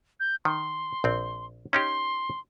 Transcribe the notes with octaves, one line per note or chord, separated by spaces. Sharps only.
G6
D#3 C6
A#1 C4
C#4 D#4 G4 C6